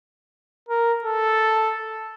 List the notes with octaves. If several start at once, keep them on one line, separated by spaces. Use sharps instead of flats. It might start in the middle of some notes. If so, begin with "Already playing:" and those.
A#4
A4